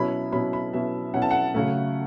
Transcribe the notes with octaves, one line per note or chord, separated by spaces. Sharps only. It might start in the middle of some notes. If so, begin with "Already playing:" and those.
Already playing: B2 F#3 C#4 E4 B5
B2 F#3 C#4 E4 B5
B5
B2 F#3 C#4 E4 E5
B2 F#3 C#4 E4 F#5
A5
F#5
C#3 F#3 A3